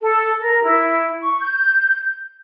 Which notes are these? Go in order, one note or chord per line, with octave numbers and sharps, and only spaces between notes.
A4
A#4
E4
C#6
G6